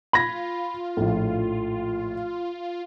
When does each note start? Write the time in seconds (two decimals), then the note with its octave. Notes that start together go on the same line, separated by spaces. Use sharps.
0.13 F4 B5 G#6 A#6
0.97 A#1 A2